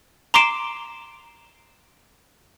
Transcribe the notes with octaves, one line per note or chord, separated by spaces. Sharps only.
A#5 C6 D6 C7 D7 E7